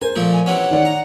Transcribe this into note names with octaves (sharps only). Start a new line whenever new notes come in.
A#4 C5 G#5
A#2 F3 A3
G#5
C3 E3 C#4 F#5
D#3 D5
A#5